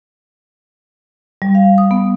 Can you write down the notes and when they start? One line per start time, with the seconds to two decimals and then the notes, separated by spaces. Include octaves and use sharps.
1.42 G3
1.55 F5
1.78 D#6
1.91 B3